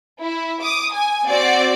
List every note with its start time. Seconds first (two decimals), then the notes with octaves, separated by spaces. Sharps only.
0.22 E4
0.63 D6 D#6
0.93 G#5
1.27 C4 F#4 D5